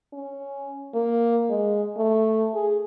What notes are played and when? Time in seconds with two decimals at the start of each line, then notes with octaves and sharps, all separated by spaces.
0.13 C#4
0.94 A#3
1.49 G#3
1.97 A3
2.54 G#4